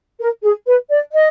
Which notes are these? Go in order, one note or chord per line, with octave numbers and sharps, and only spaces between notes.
A#4
G#4
B4
D5
D#5